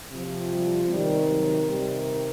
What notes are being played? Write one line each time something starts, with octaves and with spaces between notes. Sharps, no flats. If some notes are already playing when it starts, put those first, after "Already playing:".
C3 F3
G3
C3 D#3 G3
F#3
C3 D#3 G3